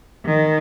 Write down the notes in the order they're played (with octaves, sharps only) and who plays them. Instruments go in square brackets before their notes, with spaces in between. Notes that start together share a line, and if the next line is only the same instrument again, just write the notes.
[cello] D#3